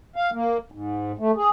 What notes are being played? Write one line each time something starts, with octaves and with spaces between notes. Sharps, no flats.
F5
A#3
G#2
A3
G#4